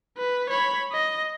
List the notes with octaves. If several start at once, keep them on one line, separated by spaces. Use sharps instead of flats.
B4
C#5 B5
D#5